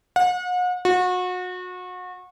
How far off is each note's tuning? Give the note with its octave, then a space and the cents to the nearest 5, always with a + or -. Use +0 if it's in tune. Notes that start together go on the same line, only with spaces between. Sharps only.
F#5 -40
F#4 -30